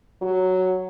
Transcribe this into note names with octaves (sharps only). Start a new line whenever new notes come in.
F#3